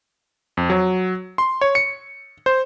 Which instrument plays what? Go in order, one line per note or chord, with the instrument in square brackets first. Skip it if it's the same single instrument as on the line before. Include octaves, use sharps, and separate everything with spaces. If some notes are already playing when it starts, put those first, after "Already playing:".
[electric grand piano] F2
F#3
C6
C#5
C#7
C5